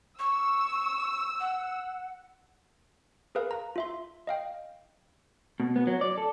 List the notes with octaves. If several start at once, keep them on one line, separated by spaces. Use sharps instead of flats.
C#6 E6
F#5
G#4 A#4 B4 F5
A#5
F4 E5 C6
D#5 F5 G5
B2
B3
F#3
D5
A4